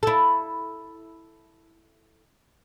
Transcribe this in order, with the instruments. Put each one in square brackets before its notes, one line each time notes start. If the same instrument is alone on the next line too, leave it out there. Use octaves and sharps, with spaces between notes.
[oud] E4 A4